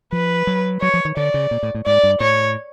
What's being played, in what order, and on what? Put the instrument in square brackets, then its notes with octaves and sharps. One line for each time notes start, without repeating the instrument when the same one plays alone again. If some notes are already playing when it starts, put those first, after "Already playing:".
[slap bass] F3 [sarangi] B4
[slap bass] F#3
[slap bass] F#3 [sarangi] C#5
[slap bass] F3
D#3
[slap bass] D3 [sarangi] D5
[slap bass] C#3
A#2
A2
A2
[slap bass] G#2 [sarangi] D5
[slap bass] G2
[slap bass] A2 [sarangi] C#5